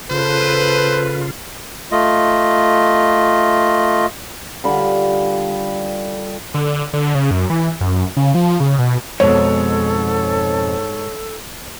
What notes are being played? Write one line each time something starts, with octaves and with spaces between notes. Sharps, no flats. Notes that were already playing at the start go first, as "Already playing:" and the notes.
C#3 F4 A4 B4 C5
A3 F4 D#5
D3 G3 F4 B5
D3
D3
C#3
F#2
E3
F#2
C#3
F3
C#3
B2
F2 G#2 B2 A4 C#5